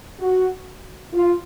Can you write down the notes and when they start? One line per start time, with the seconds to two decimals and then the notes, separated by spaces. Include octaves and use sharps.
0.20 F#4
1.14 F4